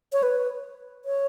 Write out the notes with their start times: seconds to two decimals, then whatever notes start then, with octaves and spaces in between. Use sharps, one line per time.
0.12 C#5
0.23 B4
1.05 C#5